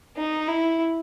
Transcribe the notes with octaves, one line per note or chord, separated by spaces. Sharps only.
D#4
E4